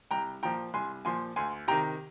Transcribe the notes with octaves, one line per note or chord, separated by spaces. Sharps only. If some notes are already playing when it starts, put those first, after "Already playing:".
C2 G5 A#5
A#2 F3 G5 A#5
C2 G#5 C6
A#2 F3 G#5 C6
D2 G#5 C6
C3 D#3 G5 A#5